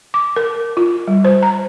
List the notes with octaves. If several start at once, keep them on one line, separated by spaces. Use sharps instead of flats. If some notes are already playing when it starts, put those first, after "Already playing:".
D6
A#4
F4
G3
C5
A#5